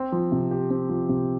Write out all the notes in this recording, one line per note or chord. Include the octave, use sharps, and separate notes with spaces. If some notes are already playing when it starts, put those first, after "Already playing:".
Already playing: C4
F3
C3
G4
C4
F3
C3